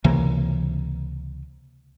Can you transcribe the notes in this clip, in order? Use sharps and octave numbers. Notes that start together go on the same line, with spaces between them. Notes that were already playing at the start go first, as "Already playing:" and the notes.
C#2 C3 E3 A#3